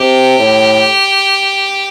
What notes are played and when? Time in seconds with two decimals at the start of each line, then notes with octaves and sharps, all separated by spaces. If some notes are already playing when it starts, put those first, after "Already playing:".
Already playing: C3 G4
0.38 A2